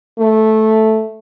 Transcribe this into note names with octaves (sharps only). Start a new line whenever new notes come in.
A3